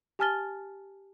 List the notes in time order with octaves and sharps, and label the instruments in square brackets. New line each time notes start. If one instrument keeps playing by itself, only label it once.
[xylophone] G4 G#5 A5 F6 A6 G7